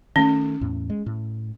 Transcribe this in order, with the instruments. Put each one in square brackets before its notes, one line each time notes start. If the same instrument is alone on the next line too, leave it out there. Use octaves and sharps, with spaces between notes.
[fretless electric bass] D#3 A3 [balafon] C#4
[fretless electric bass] E2 A2
G#3
A2